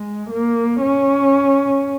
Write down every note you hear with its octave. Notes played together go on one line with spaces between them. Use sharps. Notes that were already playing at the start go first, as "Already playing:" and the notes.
Already playing: G#3
A#3
C#4